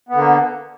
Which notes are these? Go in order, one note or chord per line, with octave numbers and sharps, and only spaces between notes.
D3 A#3 B3